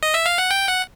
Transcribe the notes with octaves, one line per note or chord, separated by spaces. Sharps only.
D#5
E5
F5
F#5
G5
F#5